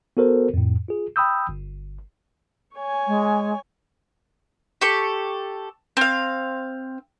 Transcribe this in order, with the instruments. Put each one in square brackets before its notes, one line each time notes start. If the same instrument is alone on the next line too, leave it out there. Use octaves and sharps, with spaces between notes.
[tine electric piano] B3 F#4 A4 A#4 C5
F2 A2
F4 G#4
G5 B5 D#6 E6 G6
G1
[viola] C#5 G#5
[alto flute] G#3
[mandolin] G4 A4 C#6
C4 F5